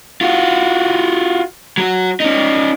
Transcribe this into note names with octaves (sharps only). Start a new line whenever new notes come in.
F4 F#4
F#3 F#4
C#4 D#4